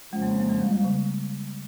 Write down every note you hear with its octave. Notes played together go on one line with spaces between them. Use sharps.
F2 C#3 F3 G#3
A#3
C4
A#3
G#3
G3
G3
C#3